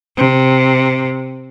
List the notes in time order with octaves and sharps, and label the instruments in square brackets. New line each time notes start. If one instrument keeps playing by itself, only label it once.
[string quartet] C3